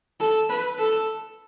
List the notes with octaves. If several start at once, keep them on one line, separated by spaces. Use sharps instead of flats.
A4
B4
A4